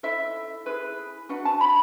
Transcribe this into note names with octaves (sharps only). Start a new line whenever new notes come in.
E4 A4 E5
E4 G#4 B4
D4 F#4 B4 F#5
A5
B5